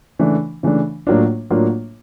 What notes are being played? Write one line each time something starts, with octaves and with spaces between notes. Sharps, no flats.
C#3 E3 A3 D4
C#3 E3 A3 D4
A2 F#3 A#3 D4 F4
A2 F#3 A#3 D4 F4